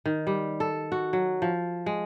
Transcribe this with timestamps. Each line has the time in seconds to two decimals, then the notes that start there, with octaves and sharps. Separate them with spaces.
0.06 D#3
0.27 G3
0.60 A4
0.92 F#4
1.13 F#3
1.42 F3
1.86 G#3